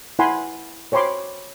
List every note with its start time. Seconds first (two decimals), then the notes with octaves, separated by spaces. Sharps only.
0.19 E4 F#5 G#5 B5 C6
0.92 C5 C#5 G5 B5 C6 D6